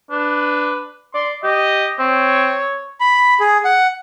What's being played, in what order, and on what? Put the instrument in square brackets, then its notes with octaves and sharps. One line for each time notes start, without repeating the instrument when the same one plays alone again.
[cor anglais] D4 [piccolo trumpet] B4
[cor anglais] D5 [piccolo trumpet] C6
[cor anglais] G4 [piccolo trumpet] D#5
[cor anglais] C4 [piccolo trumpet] C#5
[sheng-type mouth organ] B5
G#4
F#5